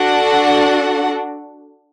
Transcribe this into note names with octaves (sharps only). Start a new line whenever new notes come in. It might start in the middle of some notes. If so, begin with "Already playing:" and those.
Already playing: D4 F#4 A4 F#5